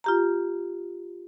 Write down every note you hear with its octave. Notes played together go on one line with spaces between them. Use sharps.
F4 G4 A#5